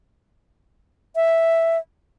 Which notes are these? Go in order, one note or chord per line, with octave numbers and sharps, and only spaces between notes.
E5